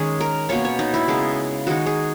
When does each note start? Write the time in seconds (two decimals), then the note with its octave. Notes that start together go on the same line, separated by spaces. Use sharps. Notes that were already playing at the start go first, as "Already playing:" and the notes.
Already playing: D#3 G#3 C#4 G#4
0.21 A#4
0.49 B2 A#3 C#4 C#5
0.65 C#5
0.79 D#4
0.94 E4
1.08 C#3 G#3 B3 D#4
1.67 D#3 G#3 D#4 F#4
1.86 G#4